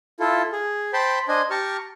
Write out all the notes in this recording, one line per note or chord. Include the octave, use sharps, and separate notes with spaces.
E4 F4 A4
G#4
C5 G5 A5 B5 C6
D4 C5 D#5 G#5
G4 A5 A#5 C#6 F6